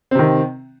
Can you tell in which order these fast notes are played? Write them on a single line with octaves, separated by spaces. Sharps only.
C4 C3 D#3